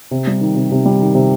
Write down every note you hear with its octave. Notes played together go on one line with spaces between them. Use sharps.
C3
G3
D#3
C3
C3
G3
D#3
C3